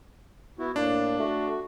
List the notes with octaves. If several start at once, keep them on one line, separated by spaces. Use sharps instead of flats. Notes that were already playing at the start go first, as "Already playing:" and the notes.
B3 E4 F#4
A2 A#3 D4
A3 F#4